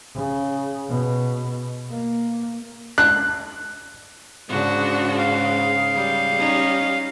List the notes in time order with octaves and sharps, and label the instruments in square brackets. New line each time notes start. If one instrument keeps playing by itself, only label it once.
[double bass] C#3
B2
A#3
[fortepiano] F#6
[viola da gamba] G#2 C#3 [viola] D4 F#4
[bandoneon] F5
[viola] G3
[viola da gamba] C#4 D#4